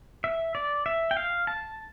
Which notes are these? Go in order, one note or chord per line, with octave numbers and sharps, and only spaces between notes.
E5
D5
E5
G5
F5
A5